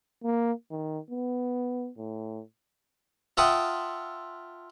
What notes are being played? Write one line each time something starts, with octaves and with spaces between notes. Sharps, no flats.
A#3
D#3
B3
A2
F4 E5 F#5 G5 A5 D#6